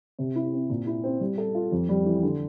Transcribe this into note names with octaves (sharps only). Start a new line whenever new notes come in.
C3
E4
C4
A#2
E4
C4
G3
A4
F4
F2
G3
E3
D3